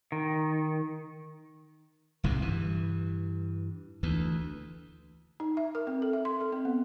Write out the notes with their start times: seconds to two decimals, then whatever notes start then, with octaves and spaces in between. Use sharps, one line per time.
0.12 D#3
2.24 D1 C2 G#2 C3
2.41 G2 E3
4.03 D2 E3
5.40 D#4
5.57 E5
5.75 A#4
5.87 C4
6.02 A4
6.13 E5
6.25 C6
6.41 A4
6.52 C4
6.65 B3